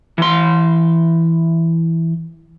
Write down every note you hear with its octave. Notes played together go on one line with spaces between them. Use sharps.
E3 C6